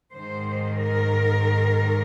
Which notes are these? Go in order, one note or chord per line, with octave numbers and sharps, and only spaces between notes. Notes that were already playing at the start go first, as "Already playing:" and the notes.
G#2 D#3 C5
A#4